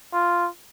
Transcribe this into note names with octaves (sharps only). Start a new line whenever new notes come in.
F4